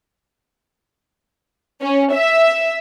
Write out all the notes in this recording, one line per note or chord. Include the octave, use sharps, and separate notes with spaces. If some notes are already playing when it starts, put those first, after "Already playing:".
C#4
E5